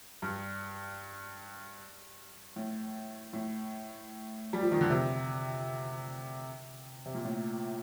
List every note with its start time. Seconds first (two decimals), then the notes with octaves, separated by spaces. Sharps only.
0.22 G2
2.56 A2
3.33 A2
4.53 G3
4.63 F3
4.72 D#3
4.81 D3
4.90 C3
7.06 C3
7.15 A#2
7.25 A2